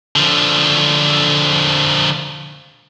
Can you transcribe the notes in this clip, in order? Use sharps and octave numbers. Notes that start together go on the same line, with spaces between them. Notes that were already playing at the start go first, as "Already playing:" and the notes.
D3 F3